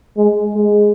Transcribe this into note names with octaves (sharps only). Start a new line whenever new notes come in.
G#3
G#3